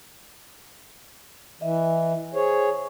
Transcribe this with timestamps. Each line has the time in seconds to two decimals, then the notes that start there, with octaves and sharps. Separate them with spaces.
1.61 E3 D#5 E5
2.34 G#4 C5 C#5